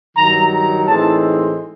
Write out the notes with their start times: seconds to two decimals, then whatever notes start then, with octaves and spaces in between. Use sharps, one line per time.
0.17 G2 D#3 F#3 A#5
0.52 A#5
0.86 A2 E3 G#3 C4 D#4 A5